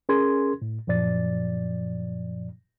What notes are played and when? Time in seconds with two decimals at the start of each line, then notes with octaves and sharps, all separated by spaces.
0.09 C#4 G#4 A#4 C6 G#6
0.62 A2
0.87 F#2 A#2 F3 D5 A6